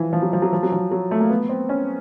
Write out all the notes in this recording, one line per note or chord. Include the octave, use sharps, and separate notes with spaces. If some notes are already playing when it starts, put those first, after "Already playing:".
Already playing: E3 F3
F3
F#3
F3
F#3
F3
F#3
F3
F#3
A3
A#3
B3
C4
C#4